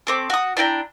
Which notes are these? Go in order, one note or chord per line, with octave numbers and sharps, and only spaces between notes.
A3 C4 D6
F#4 D#6
D4 E4 G5 A#5